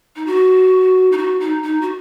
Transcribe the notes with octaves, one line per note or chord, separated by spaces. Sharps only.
D#4
F#4
D#4
F#4
D#4
D#4
F#4